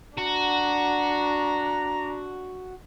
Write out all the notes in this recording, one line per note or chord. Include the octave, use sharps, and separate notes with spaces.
D4 F#4 A#5